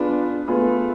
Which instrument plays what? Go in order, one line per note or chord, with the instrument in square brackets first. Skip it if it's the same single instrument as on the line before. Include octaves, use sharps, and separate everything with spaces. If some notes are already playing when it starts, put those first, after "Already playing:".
Already playing: [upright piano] B3 F4 G#4 B4 [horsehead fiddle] D4
[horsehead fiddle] A3 [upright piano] B3 F4 G#4 B4